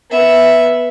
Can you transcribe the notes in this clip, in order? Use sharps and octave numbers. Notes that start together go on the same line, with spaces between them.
B3 E5